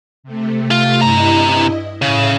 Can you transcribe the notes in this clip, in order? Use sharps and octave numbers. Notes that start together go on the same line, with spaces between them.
C3 A3
F4
G2 C3 E4 D#5 A#5
A2 C#3 E5 A#6